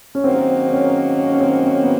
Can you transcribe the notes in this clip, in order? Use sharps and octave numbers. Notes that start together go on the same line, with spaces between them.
C#4
G#2 D#3 F#3 A#3 C4
C#4
C#4
C#4
C4
C#4
B3